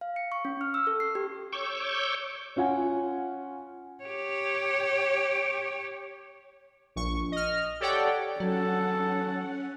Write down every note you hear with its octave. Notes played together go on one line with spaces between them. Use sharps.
F5
C#7
C#6
C#4
F6
E6
A4
C7
G4
C#5 C#6 D6 E6 G6
C#4 F4 F#5 G#5
G4 C#5
A#1 C#6
D#5 F6
G4 A4 C#5 D5 F#5 G5
F#3 C#4 A4 F#5